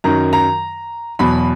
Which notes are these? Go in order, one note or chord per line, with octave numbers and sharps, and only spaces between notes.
F#2 D#3 F#3 A#5
A#5
E2 B2 F#3 B5